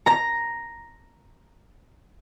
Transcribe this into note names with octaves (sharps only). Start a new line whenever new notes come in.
A#5 A#6